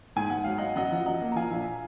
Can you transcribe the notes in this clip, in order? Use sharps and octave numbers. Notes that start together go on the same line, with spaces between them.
G#2 G#5
G#2 F#5
F#3 F5
F#3 D#5 F#5
F#2 D#5 F#5
F3
F#2 D#5 F#5
A#3
A#5
F3 F5 G#5
A#1